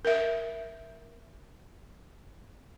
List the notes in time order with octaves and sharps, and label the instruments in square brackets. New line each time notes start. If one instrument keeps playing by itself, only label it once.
[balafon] A#4 E5